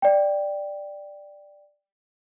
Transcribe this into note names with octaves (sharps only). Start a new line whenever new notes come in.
D5 G5